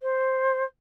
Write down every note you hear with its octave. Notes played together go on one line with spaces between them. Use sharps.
C5